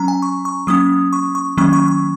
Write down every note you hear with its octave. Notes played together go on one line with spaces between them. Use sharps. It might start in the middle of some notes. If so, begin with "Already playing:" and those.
Already playing: F#3 C#4 A#5
G#5
C#6
C#6
F#3 A#3 C#4 D#6
C#6
C#6
D#3 F#3 A#3 C#4 C#6
C#6
C#6